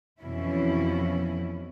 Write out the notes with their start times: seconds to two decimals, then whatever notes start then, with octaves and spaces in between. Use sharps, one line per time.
0.20 F2 B2 E3 C#4 E4